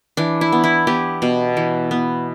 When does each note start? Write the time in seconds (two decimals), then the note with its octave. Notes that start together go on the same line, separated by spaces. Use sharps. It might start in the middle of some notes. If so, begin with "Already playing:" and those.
0.17 E3 D4
0.41 E4
0.52 B3
0.64 E4
0.87 B3 G4
1.22 B2
1.57 E3
1.91 B3